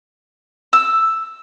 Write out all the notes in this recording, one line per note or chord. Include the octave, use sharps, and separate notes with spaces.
E6